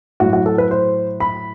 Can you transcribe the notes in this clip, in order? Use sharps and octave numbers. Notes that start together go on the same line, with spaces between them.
A2 F#3 F#4
F#4
A4
B4
C5
B5